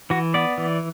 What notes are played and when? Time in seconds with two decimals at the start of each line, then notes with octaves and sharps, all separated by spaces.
0.10 E3 F#4
0.34 B3 D5
0.58 E3